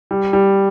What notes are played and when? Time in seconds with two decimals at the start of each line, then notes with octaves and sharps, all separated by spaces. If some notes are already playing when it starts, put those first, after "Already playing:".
0.11 G3
0.33 G3